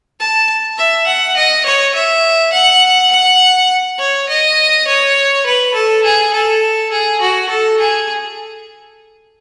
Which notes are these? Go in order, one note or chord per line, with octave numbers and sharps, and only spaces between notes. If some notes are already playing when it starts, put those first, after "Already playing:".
A5
E5
F#5
D#5
C#5
E5
F#5
F#5
C#5
D#5
C#5
B4
A4
G#4
A4
G#4
F#4
A4
G#4